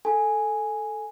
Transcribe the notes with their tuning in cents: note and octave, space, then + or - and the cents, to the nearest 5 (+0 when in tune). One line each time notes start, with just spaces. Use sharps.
A4 +0 G#5 +0